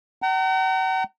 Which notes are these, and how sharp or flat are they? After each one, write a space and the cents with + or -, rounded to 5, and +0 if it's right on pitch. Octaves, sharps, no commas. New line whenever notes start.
F#5 +45 A#5 -30